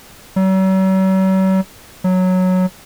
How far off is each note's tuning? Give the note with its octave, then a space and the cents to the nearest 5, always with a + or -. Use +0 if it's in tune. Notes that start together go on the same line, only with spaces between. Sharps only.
F#3 +45
F#3 -5